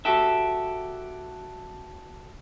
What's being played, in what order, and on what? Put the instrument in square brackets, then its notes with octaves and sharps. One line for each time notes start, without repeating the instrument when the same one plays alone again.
[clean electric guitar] F#4 G4 A4 E5